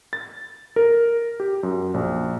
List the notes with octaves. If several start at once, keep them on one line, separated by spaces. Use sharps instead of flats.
A6
A#4
G4
F#2
A#1